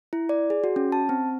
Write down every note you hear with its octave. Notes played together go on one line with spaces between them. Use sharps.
E4
D5
G#4
F#4
C#4
A5
C4